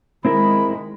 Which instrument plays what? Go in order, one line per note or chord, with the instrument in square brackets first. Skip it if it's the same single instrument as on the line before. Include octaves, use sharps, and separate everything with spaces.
[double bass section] D#3 G#3 [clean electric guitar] C4 E4 A#4 [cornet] B5